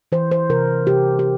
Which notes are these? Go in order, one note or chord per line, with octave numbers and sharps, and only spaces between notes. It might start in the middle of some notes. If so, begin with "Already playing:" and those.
E3 C5
C5
C3 A#4
C3 G4
G4